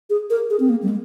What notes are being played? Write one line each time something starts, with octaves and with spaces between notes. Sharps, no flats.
G#4
A#4
G#4
C4
A#3
G3
G#3